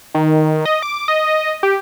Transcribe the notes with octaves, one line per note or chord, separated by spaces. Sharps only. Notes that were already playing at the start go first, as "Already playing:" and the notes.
D#3
D#5
D6
D#5
G4